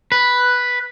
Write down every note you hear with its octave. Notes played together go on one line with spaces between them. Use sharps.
B4